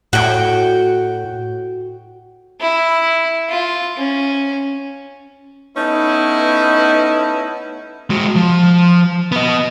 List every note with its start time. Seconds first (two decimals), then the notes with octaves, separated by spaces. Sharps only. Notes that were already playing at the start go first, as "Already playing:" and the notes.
0.13 A2 F#4 G5
2.61 E4
3.49 F4
3.97 C#4
5.76 A3 B3 C#4 D#4 E4
8.10 G#3 F#4
8.35 F3
9.32 B3 D#5